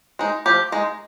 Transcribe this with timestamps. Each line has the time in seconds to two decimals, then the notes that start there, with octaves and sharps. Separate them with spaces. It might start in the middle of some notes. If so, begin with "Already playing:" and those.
0.19 G#3 D#4
0.46 F3 G4
0.72 G#3 D#4